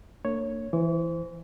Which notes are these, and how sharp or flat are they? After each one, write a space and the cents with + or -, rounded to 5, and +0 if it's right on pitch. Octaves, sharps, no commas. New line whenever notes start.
A#3 -35 D4 +10 C#5 +0
E3 +10 C5 -20 D6 -45